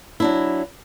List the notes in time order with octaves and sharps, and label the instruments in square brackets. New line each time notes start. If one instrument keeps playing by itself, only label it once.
[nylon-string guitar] F#3 D4 E4